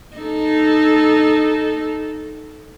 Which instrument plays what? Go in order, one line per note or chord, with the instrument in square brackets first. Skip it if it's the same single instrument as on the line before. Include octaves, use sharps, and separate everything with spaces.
[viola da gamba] D#4 A4